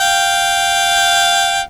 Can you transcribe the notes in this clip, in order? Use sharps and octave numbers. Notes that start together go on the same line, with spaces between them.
F5 G5